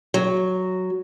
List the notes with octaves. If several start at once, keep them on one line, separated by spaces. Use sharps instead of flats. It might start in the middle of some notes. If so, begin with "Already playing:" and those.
F#3